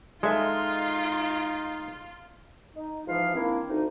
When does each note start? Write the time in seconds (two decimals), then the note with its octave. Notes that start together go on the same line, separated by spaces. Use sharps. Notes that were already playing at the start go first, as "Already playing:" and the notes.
0.23 G#3 D#4 F4 A4 E5 G#5
2.74 D#4
3.06 G#2 E3 F3 F4 F5
3.34 D#3 A#3 C4 D4 E4
3.68 D2 D#4